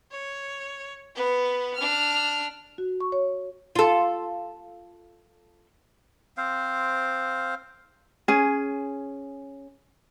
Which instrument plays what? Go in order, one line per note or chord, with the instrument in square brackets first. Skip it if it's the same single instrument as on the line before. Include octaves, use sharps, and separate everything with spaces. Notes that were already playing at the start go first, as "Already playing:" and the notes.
[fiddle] C#5
B3 B4
D4 F6
[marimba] F#4
C#6
C#5
[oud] F4 A4
[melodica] C4 C5 F5
[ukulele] C#4 G#4